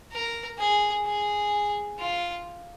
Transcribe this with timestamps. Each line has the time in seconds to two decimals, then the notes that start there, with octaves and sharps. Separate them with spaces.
0.12 A#4
0.59 G#4
1.06 G#4
2.00 F4